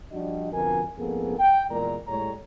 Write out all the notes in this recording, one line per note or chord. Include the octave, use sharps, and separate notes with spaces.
F3 G3 D4 F#4 D#5
F2 B2 D3 F3 A#4 G#5
F2 G#2 A#3 B3 G#4 A4
G5
E2 A#2 G#3 A#4 D5 A#5
A2 G3 G#3 A4 C#5 A#5